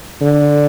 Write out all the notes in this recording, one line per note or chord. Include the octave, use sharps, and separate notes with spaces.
D3